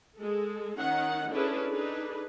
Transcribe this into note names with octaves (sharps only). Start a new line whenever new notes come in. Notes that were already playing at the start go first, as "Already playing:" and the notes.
G#3 A4
D#3 C#4 D#4 F#5
C#4 D4 E4 G#4 A4 B4
D4 D#4 G#4 A4 B4